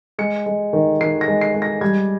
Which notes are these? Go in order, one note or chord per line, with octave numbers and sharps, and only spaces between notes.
G#3 C#7
G#3
D#3
D#3 C7
A#6
G#3
C7
G#3
A#6
G3 G#6